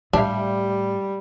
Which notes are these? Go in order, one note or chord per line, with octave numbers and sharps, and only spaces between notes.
A2 G3 D4 G4 E5 F5